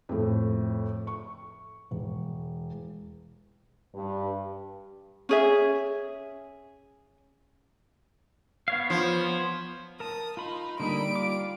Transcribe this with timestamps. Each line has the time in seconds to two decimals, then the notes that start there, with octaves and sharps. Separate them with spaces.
0.09 F2 A2
1.07 C#6
1.91 E1
3.94 G2
5.29 C#4 G#4 E5
8.68 B3 C#5 F5
8.90 F3
10.00 A#4 A5 D#6
10.37 D#4 F4 B5 C6
10.80 D3 G3 A#3 D#4 D#5 B5 D7
11.15 F4 D6